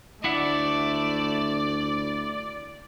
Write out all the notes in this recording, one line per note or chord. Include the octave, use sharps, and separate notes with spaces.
D2 A3 E4 D5 E5 F#5